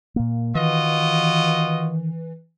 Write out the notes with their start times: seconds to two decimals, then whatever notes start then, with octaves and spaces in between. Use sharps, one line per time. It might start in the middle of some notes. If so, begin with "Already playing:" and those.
0.16 A#2 A#3
0.55 D#3 E3 F4 F#4 D#5